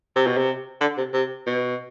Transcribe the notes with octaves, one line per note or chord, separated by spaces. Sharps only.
C3
B2
C3
D3
C3
C3
B2